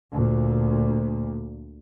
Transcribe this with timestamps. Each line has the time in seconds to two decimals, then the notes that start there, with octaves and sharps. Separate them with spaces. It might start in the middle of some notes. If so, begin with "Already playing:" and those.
0.13 D2 A#2